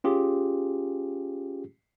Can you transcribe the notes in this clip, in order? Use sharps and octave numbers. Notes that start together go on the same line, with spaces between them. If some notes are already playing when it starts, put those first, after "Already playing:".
C#4 F4 G4 G#4